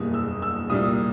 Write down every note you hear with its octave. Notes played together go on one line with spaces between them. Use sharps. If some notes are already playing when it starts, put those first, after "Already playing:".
Already playing: F#1 E2 B2 G3 A#3 D#6
E6
E6
C2 A#2 G3 A#3 D#6